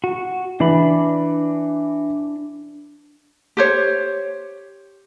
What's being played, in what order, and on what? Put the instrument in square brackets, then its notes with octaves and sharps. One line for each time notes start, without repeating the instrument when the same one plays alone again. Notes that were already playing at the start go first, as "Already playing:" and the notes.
[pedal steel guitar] F#4
[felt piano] E3 [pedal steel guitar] D4 B5
[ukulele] G4 C5 C#5